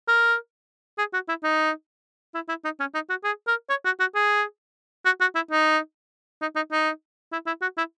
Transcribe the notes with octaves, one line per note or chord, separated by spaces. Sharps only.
A#4
G#4
F#4
E4
D#4
E4
E4
D#4
C#4
D#4
F#4
G#4
A#4
C#5
F#4
F#4
G#4
F#4
F#4
E4
D#4
D#4
D#4
D#4
E4
E4
F#4
E4